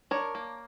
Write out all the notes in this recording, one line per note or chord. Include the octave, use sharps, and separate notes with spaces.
D4 A#4 C#5
A#3